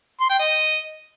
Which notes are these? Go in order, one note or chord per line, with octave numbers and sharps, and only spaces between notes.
C6
G5
D#5